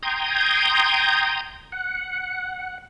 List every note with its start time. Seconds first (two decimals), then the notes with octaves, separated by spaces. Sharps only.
0.03 G5 A#5 C6 D#6 G6 G#6
1.72 F#5